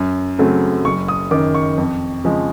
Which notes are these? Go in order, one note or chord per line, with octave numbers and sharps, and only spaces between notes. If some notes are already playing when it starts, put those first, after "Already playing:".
Already playing: F#2
C#3 F#3 A3 C4
F#1 C#6
D#6
F#2 D#3 D6
C#6
F2
C#3 F3 G#3